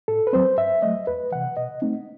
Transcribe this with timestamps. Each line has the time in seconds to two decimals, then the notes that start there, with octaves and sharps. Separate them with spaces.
0.08 A2 A4
0.27 B4
0.33 F#3 C4 C5
0.57 G2 E5
0.82 F#3 A3 D#5
1.07 E2 B4
1.32 C3 E3 F#5
1.57 B2 D#5
1.82 A3 C4 D#4